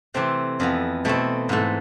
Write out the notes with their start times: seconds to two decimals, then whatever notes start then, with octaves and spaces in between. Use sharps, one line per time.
0.14 C3 E3 A3 C4
0.60 F2 E3 B3
1.05 B2 A3 C4 E4
1.49 G#2 E3 A3